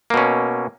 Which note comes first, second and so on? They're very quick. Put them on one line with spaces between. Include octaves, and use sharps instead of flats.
A#3 B2 C#4